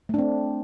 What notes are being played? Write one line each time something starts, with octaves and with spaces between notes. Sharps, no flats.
A3 C4 D4